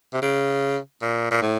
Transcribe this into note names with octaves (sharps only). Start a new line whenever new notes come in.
C3
C#3
A#2
A#2
A2